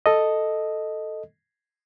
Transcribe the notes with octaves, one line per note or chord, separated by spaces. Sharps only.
A4 D#5